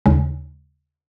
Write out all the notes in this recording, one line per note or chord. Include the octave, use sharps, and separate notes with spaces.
D#2 C#3 G#3